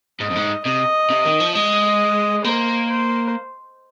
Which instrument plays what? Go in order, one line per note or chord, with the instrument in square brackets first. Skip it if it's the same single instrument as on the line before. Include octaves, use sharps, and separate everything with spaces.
[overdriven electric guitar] G#2 [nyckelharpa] D#5
[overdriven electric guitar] F2
G#2
[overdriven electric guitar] C3 [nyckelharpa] D#5
[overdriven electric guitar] C3
D#3
F3
[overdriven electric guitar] G#3 [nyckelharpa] D#5
[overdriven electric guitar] A#3 [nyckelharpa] C5
[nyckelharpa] C5